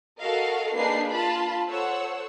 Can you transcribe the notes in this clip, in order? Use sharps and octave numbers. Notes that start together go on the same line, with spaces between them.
F#4 A4 A#4 D#5 F5
A#3 D4 D#4 G#4 B4 C7
F4 A5 B5
A4 C5 C#5 F#5 E6